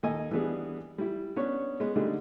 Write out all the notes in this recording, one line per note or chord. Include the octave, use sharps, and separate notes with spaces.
D#2 A4 D#5 G#5
E3 G3 B3 D4 G#4
G3 E4
B3 C#4 D4 C#5
G#3 B3
D3 G3 A3 D4 D#4 G#4